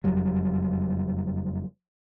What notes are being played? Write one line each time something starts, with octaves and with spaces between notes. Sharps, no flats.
F#1 F2 F#3 G3